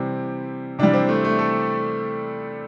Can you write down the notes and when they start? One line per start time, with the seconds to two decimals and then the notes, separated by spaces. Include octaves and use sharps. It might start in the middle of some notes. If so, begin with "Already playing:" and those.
Already playing: C3 E3 G3 C4
0.79 C3 E3 G3 D4
0.93 C4
1.09 A3
1.25 A3
1.39 A4